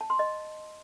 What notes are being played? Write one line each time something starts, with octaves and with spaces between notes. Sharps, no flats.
A5
C6
D#5